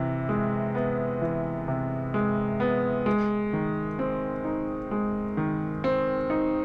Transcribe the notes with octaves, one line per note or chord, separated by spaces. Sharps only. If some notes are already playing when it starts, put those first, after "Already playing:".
Already playing: C3 E3
G#3
B3
E3
C3
G#3
B3
G#3
D#3
C4
D#4
G#3
D#3
C4
D#4